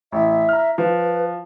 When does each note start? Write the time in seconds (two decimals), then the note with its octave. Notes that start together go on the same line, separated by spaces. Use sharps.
0.12 A1 E5
0.49 A#5 F6
0.78 F3 B4